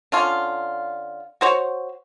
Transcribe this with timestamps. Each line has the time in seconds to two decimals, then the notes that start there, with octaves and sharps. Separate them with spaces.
0.12 D3 C#4 F4
1.41 F#4 C5 C#5